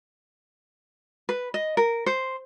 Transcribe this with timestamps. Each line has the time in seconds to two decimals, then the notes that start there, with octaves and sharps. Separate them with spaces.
1.29 B4
1.54 D#5
1.77 A#4
2.06 C5